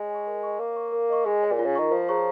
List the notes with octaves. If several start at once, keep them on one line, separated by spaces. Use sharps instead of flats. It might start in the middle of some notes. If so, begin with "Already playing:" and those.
Already playing: G#3 C#5
G#5 C#6
A#4
D#5 C#6
A#3 C#5
F5 C#6
A#4
D#5 C#6
G#3 G#4
C#5 G#5
A#2
F4
C#3
D#3 A#4 D#5 A#5 C#6
F3 F4
G#4 C#5 A#5 C#6